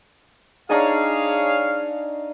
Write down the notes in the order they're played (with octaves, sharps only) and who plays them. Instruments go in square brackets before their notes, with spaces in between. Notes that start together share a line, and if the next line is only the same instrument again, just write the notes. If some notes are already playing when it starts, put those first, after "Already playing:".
[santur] D4 D#4 A5 [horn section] G#4 C#5 F5